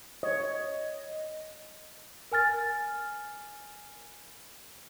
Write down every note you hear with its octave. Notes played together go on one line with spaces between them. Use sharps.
C#5 D#5
A#4 G#5 F6 A6